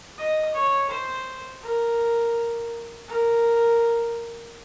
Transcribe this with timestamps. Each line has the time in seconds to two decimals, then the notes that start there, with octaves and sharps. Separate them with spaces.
0.18 D#5
0.55 C#5
0.90 C5
1.62 A#4
3.08 A#4